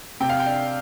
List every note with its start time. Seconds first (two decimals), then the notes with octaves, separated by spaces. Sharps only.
0.20 C3 G5
0.29 F5
0.40 G5
0.46 D4